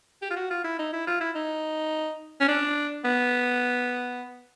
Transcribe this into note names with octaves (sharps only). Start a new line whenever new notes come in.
G4
F4
F#4
F4
E4
D#4
E4
F4
E4
D#4
C#4
D4
B3